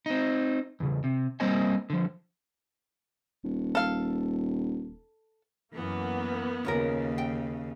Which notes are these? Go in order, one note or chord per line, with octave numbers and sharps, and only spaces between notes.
C4 D#4
E2 C#3
C3
G3 A#3 C4 C5 D#5 G#5
D3 F3
D#1
A4 F5
F#2 E3 A#3 B3
D#2 C#3 C#4 F4 A#4
G5